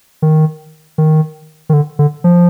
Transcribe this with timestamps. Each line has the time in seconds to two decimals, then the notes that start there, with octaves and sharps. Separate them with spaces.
0.22 D#3
0.98 D#3
1.69 D#3
1.73 D3
1.99 D3
2.24 F3